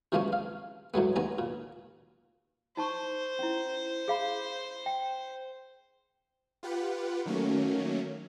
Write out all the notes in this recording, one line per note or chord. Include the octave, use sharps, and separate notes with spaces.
C3 E3 F3 G#3 A#3 C#4
F5
A2 F#3 G#3 B3
D#2 B3 G#5 A#5
A#2
D#4 C5 A5 C#6
C#4 E4
G#4 F5 B5
G5
F4 G4 B4 F#5
D#3 F#3 A3 A#3 C#4